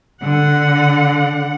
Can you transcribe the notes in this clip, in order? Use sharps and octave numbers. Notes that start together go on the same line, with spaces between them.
D3 F#5